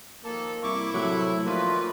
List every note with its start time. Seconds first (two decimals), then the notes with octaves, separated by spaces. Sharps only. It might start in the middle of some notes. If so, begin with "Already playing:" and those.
0.24 D#3 F3 A#3 A4
0.63 C2 E4 C#6 D6
0.94 A2 C3 F#3
1.45 D#3 F3 A3 A#3 D4 F4 B4